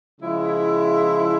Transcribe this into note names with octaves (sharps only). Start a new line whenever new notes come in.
C#3 F3 G#3 E4